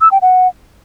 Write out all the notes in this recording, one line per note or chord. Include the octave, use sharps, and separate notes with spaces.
E6
G5
F#5